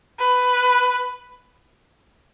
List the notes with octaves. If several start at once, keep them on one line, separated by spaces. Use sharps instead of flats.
B4